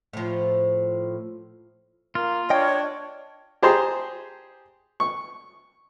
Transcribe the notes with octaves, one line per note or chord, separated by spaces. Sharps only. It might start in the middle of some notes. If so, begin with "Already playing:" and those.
A2 F3
A#3 F4
D4 C#5 D#5 G5
G4 G#4 C5 A5 A#5 C6
C#6